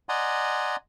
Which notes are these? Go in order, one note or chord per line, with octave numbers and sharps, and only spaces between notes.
D5 D#5 F#5 G#5 A#5 C6